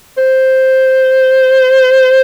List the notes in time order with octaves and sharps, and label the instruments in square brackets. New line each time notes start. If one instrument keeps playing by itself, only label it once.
[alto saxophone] C5